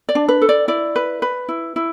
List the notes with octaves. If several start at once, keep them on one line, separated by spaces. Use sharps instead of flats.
D5
D4
B4
A4
D5
E4 D5
B4
B4
E4
E4